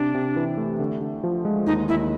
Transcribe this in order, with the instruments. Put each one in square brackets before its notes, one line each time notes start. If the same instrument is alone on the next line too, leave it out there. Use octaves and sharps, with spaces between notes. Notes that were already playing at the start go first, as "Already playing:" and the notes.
Already playing: [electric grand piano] C3 [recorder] D4
[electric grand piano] C3
E3
A3
D3
D3
F3
G#3
[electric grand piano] D#2 [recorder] D#4
[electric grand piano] D#2 [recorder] E4